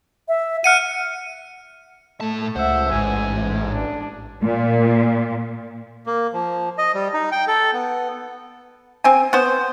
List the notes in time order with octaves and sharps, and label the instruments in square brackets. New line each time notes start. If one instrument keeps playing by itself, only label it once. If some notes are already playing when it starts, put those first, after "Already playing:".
[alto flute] E5
[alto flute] F#5 [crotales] F6 C#7 D#7
[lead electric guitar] A2 A5 [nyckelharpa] A3
[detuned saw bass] C#2 [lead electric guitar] C5 [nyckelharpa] E5 F#5
[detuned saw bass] A1 [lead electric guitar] G#2 [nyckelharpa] G#5
[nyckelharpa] D4
[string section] A#2
[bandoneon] A#3
F3
D#5
G3
D#4
G5
A4
B3
[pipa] C4 G#5
B3 C5